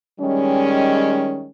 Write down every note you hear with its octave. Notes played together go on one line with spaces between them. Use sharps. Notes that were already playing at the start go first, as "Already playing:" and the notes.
D#3 G3 G#3 C#4